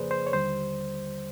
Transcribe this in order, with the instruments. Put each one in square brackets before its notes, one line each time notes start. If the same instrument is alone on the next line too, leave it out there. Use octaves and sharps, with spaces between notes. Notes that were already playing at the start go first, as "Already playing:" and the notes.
Already playing: [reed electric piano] F2 C#3 F3 A#3 G#4 B4 C5 D5
C5
C#5
D#2 D3 G3 C5